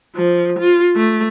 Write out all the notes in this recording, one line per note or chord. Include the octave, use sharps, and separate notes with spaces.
F3
F4
A3